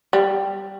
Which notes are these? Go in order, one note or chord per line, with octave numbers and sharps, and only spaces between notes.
G3